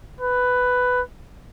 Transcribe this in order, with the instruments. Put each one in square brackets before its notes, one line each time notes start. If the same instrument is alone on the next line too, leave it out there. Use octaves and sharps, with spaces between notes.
[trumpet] B4